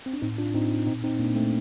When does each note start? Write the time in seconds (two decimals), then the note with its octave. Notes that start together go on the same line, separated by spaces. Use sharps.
0.06 C4
0.13 D4
0.22 A2 C4 D#4
0.38 D4 F4
0.54 A2 C4 D#4
0.87 A#2 C4 D#4
1.04 C4 D#4
1.20 A#2 A#3 D4
1.36 A3 C4